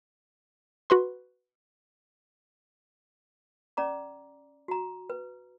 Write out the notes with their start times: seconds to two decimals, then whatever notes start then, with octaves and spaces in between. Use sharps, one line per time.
0.90 F#4 B4 C6
3.77 C#4 D5 A#5 D6
4.68 F#4 A#5
5.10 B4